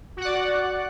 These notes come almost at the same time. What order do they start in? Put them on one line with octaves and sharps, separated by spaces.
F#4 F#5 D5